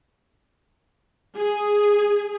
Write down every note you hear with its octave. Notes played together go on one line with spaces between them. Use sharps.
G#4